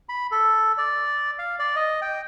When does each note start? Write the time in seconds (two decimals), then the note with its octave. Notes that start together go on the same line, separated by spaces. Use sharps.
0.09 B5
0.31 A4
0.78 D5
1.39 F5
1.59 D5
1.76 D#5
2.02 G5